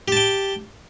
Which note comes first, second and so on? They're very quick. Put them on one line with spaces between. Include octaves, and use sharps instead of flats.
G4 A5 G5